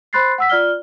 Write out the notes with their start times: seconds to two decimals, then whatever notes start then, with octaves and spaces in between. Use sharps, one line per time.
0.13 C5 B5 C6 F#6 A6 C7
0.38 F#5 E6 B6
0.49 F4 D5 F6 G7